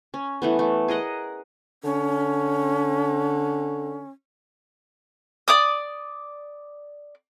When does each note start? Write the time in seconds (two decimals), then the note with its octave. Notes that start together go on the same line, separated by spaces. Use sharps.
0.14 C#4
0.42 E3 A3 B3
0.59 A3
0.88 G#4 A#4 D#5 F#5
1.83 D3 C#4
5.48 D5 D6 D#6